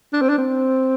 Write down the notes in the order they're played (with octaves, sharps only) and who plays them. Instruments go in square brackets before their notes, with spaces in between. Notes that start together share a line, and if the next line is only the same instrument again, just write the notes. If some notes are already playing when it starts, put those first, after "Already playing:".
[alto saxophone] D4
C4
D4
C4